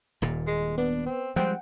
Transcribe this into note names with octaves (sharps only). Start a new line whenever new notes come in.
D#1 D#2 A#2
G#3
B3 D4
C4
F3 G3 G#3 C4 F#5 G5